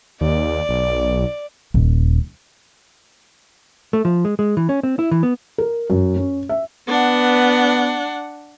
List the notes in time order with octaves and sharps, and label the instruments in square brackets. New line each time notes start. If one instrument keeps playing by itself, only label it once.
[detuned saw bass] D#2 [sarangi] D5
[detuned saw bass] B1
[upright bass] D#1
[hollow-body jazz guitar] A3
F3
G#3
G#3
E3
C#4
C4
E4
E3
B3
[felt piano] A#4
F#2
C#4
E5
[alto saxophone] B3 [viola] D4 F#5